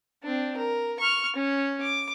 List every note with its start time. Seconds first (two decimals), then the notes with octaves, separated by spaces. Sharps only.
0.23 C4 D4
0.57 A#4
1.00 C#6 F6
1.36 C#4
1.82 D6